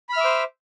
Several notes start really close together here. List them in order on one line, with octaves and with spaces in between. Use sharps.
B5 F6 E5 D6 C5